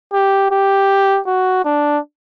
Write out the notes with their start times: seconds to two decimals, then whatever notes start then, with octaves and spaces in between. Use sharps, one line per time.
0.13 G4
0.51 G4
1.27 F#4
1.65 D4